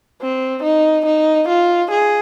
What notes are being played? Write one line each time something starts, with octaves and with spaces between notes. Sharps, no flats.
C4
D#4
D#4
F4
G#4